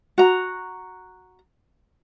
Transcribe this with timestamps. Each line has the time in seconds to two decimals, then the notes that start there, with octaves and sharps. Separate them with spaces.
0.18 F#4 A#5